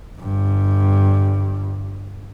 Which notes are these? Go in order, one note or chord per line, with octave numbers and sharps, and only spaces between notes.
G1 G2